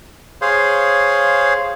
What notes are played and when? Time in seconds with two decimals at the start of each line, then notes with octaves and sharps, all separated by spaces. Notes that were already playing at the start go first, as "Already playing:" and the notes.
0.41 G#4 C5 C#5 F5 C6